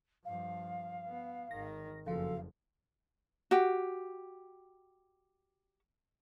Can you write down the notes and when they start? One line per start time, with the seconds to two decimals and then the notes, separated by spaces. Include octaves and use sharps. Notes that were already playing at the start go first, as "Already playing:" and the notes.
0.25 G2 F3 F5
1.06 B3
1.51 G#1 D#3 A#6
2.06 F#1 F2 C#3 F3 F#4 A4 F5
3.51 F#4 G4